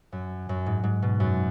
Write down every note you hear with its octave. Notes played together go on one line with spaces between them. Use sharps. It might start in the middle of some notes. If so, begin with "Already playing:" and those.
F#2
F#2
G#2
G#2
B2
F#2